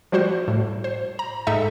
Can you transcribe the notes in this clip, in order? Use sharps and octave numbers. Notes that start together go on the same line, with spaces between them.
F3 G3 F#4 C5
A2
C5
A#5
G#2 D#4 A4 E5